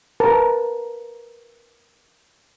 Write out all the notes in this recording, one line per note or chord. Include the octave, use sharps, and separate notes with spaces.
A#4 B4 A5